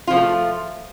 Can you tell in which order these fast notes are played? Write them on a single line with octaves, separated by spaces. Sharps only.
F4 F3 A#3 A3